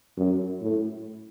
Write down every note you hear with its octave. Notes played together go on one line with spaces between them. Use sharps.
F#2
A2